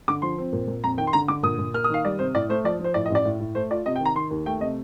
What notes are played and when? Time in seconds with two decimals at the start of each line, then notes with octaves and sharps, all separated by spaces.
0.08 D3 D6
0.22 F3 C6
0.38 C4
0.53 A#2
0.67 A#2
0.84 F2 A#5
0.98 D#3 G5
1.07 C6
1.13 D3 A#5
1.28 D3 D6
1.43 A#2 D#6
1.58 A#2
1.74 A#3 F6
1.84 D#6
1.89 D#3 F5
2.05 G3 D5
2.19 C3 C5
2.34 A2 D5
2.49 A3 C5
2.64 F3 D5
2.79 F3
2.84 C5
2.94 A2 D5
3.06 D#5
3.10 A1
3.15 D5
3.25 A2
3.40 A2
3.55 A3 C5
3.71 F4 D5
3.86 C3 D#5
3.96 G5
4.01 D#3 A#5
4.15 D#3 C6
4.30 D#2
4.46 A3 G5
4.61 C3 D#5